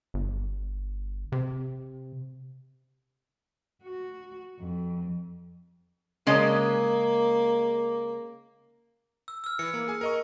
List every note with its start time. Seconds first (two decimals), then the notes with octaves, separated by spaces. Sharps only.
0.14 G1
1.32 C3
3.84 F#4
4.61 F2
6.27 C#3 G#3 A#3 D#5
9.28 E6
9.44 E6 F6
9.59 E3 C#7
9.74 A#3
9.88 G#4 G#5
10.01 A#4 D#5 C#6